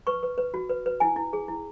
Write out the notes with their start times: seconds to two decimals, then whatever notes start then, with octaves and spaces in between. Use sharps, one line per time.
0.07 B4 C#6
0.23 B4
0.38 B4
0.54 F#4
0.69 B4
0.86 B4
1.00 E4 G#5
1.16 E4
1.33 G#4
1.48 E4